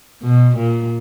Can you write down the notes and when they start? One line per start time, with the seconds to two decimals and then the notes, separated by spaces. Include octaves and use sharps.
0.23 B2
0.57 A#2